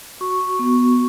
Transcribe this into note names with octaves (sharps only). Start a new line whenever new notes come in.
F#4 C#6
B3